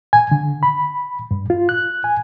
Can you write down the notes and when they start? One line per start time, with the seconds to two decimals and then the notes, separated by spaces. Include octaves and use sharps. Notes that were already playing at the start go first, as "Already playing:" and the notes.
0.13 G#5
0.32 D3
0.63 B5
1.31 G2
1.50 F4
1.69 F#6
2.04 G#5